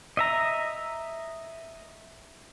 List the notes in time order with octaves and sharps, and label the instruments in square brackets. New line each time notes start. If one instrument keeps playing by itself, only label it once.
[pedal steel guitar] D#5 E5 A#5